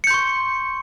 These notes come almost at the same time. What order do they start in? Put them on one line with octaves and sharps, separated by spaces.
C#7 G6 C6 C#6